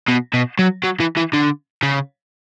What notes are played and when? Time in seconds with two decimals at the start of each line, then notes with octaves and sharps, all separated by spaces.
0.09 B2
0.34 B2
0.59 F#3
0.84 F#3
1.00 E3
1.17 E3
1.33 D3
1.83 C#3